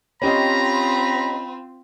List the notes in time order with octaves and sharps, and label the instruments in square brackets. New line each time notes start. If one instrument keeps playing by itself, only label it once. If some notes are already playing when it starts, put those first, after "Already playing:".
[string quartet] C4 F4 [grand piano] C#4 G4 D#5 [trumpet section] A#5 [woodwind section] B5